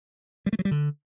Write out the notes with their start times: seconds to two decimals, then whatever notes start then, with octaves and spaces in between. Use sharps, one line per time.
0.46 G3
0.53 A3
0.59 F#3
0.65 G3
0.71 D3